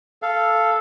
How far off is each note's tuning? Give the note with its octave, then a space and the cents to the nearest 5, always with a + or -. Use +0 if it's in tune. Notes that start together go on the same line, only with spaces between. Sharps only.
A4 -5 F5 -10